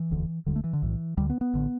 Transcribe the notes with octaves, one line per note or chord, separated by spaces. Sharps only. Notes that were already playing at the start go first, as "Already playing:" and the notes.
Already playing: E3
E1 D2 D3
E1 D2 D3 G3
A3
E3
D3
B1 A2 E3
D2 D3 G3
B3
B3
A1 D3